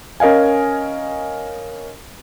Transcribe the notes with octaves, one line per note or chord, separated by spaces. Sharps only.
C#4 A#4 D#5 F5 G#5